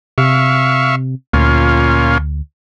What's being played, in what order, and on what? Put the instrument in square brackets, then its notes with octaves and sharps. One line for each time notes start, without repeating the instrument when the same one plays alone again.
[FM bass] C3 [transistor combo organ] E5 F5 C#6
[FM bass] D2 [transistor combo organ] A#2 C#4 F4